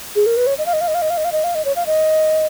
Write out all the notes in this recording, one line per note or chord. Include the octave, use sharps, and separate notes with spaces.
G#4
A#4
B4
C#5
D#5
F5
D#5
F5
D#5
F5
D#5
F5
D#5
F5
D#5
F5
D#5
C#5
F5
D#5